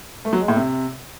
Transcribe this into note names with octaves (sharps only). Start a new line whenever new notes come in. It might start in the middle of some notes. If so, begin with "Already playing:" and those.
A3
F#3
G#3
A2
C3